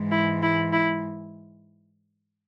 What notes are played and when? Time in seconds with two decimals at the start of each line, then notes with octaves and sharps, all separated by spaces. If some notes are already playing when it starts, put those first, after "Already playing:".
Already playing: G#2 E3 G#3
0.12 E4
0.43 E4
0.73 E4